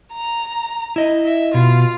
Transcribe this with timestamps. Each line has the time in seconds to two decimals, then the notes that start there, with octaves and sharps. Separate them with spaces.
0.14 A#5
0.96 E4 D#5
1.26 E5
1.54 B2 F4